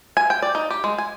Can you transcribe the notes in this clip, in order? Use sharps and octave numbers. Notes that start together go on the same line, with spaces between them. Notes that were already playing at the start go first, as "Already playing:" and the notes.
G#5
G5
D5
D#4
G4
G#3
G#5